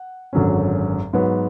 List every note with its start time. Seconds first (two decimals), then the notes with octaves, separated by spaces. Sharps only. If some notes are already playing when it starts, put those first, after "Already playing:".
Already playing: F#5
0.33 G#1 F#2 D3 F#3 C#4
1.13 G#2 F#3 B3